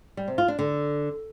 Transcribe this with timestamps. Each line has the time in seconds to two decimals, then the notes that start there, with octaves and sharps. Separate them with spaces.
0.17 G3
0.28 C3
0.38 F4
0.48 D4
0.59 D3